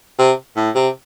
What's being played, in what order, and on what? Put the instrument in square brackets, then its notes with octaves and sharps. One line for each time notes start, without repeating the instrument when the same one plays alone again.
[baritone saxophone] C3
A2
C3